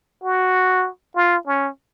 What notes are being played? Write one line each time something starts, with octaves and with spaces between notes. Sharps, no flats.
F#4
F4
C#4